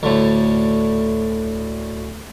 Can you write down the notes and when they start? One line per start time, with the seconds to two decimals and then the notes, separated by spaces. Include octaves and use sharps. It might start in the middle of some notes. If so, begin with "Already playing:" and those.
0.03 D2 A2